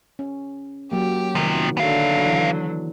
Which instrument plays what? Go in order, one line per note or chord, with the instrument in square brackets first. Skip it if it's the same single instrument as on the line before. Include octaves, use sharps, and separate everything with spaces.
[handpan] C#4
[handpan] F#3 A#3 [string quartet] G4
[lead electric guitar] C3 F3 [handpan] D#3
[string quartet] D3 F#3 [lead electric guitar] B3 F5
[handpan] E3